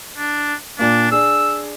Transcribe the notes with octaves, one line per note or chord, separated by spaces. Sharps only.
D4
A#2 A#3 D4
D4 G#4 E6